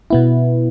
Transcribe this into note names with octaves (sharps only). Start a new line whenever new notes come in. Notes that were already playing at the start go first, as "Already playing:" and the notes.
B2 B3 E4